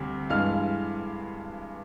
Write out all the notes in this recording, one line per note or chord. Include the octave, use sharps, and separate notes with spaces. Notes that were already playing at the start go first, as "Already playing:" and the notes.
Already playing: D2 C3 G3
G2 E3 G#3 F5 F6